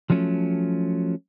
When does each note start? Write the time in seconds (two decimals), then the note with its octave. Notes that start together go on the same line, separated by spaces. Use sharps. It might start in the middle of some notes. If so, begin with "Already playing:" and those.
0.10 F3 F#3 A3 C#4